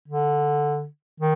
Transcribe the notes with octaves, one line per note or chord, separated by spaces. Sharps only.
D3
D#3